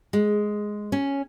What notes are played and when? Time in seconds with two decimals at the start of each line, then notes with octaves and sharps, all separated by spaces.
0.13 G#3
0.92 C#4